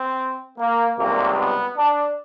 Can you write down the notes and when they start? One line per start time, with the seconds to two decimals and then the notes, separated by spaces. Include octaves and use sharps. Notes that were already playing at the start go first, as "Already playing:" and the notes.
Already playing: C4
0.58 A#3
0.97 C#2 C3 D#3 G3 A#3
1.37 B3
1.77 D4